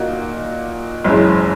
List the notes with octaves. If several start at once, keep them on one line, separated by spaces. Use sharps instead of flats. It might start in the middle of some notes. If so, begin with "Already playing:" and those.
Already playing: A#2 A#3 D#4 F#4
F#1 F#2 E3 G#3 C#4